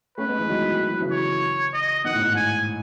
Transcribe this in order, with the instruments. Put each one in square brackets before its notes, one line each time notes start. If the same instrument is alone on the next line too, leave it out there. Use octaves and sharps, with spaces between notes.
[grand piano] A3 C#4 [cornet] B4
[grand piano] G#3 B3
E3 G#3
D#3 F#3
E3
F#3
C#3 E3
[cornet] C#5
D#5
[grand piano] B2 D#3 [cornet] F#5
[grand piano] A2
G#2
[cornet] G#5